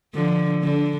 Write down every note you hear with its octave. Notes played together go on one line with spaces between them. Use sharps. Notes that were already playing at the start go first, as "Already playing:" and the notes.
D3 F3
D3